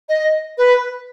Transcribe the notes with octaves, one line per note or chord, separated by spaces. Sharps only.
D#5
B4